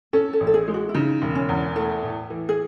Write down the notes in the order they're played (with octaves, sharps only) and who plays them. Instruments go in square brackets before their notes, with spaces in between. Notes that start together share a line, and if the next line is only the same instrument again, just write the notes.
[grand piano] C#4 [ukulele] A4
[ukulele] A4
[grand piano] A1
[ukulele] A4
G#4
[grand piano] G#3
[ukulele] F#4
E4
[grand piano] C#3 [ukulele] D#4
[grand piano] E1
[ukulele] C#4
[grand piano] E2
[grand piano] A3 [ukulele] E4
[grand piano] A2
E3
[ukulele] G#4